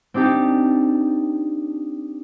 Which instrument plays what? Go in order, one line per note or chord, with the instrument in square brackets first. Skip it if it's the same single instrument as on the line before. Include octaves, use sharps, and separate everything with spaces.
[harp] C4 D4 D#4 G4 A5